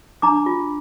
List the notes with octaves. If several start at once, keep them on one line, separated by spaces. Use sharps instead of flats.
D4 A#5 D6
F4